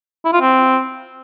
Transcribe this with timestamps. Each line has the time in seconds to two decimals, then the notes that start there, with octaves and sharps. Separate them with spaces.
0.25 E4
0.33 F4
0.41 C4